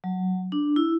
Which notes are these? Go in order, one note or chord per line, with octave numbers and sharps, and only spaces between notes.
F#3
D4
E4